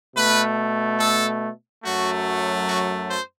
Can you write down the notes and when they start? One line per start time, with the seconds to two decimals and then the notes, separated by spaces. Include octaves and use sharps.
0.16 B2 A3 B4
1.00 A4
1.84 F#2 F#3 A3 F#4
2.67 F#4
3.10 C5